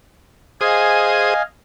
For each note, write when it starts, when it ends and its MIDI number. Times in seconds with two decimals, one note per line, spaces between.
0.61 1.34 68
0.61 1.34 72
0.61 1.42 75
0.61 1.42 77
0.61 1.42 80
0.61 1.34 87